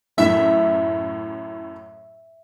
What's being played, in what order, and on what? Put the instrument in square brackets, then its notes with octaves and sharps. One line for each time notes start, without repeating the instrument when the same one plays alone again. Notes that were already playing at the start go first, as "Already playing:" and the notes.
[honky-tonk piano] F#2 A2 [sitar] E5